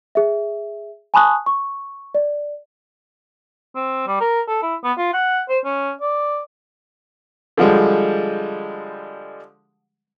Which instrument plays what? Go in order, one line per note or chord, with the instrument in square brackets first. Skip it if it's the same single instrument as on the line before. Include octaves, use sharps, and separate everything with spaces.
[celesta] G#4 E5
G#5 A5 B5 C#6 D#6 F#6
C#6
D5
[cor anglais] C4
G3
A#4
A4
E4
B3
F4
F#5
C5
C#4
D5
[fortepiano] D3 F3 G3 G#3